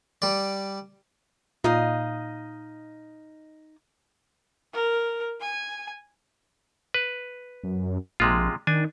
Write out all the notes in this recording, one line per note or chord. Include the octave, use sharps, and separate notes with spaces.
G3 D5
A#2 D#4 D#5 F5
A#4
G#5
B4
F#2
A#1 C3 G#3 F4
D#3 D4 G#5